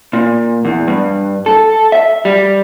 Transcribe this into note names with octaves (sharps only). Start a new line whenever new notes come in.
A#2
E2
G2
A4
E5
G3